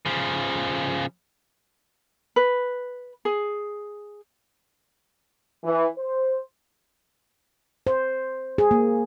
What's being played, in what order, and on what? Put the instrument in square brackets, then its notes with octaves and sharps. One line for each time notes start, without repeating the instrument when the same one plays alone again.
[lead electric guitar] C#3 F3
[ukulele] B4
G#4
[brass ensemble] E3
C5
[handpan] C5
G#4
A#3